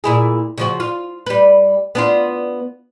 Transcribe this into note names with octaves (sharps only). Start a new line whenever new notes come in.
A#2 E4 G#4
C#3 F3 F#4
F4
G3 B4
B3 D4 F4